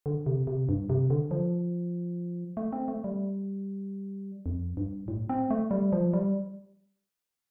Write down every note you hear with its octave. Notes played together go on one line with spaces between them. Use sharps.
D3
C3
C3
G2
C3
D3
F3
A3
C4
A3
G3
F2
G2
A2
C4
A3
G3
F3
G3